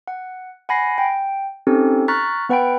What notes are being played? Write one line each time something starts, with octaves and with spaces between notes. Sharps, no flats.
F#5
F#5 G#5 B5 A#6 C7
G5
C4 C#4 D#4 G4 A4
A#5 C#6 F6 F#6 A6 B6
B3 B4 F#5 G5 B5 D7